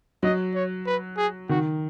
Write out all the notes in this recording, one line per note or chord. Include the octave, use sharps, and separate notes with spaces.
F#3 D#5
C#5
B4
G#4
D#3 F#4